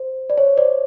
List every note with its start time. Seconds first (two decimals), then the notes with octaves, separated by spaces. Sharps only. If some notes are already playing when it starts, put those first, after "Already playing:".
Already playing: C5
0.30 D5
0.38 C#5
0.57 C5 D5